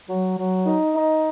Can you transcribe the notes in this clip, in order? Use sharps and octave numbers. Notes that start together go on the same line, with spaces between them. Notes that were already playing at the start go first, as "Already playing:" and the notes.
F#3
F#3
D#4
D#4